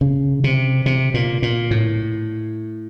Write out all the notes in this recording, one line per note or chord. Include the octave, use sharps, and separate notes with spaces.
C#3
C3
C3
A#2
A#2
A2